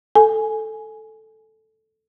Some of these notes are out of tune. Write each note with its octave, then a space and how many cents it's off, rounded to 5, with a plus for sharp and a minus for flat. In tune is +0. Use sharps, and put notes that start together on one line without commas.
A4 +0 G#5 +10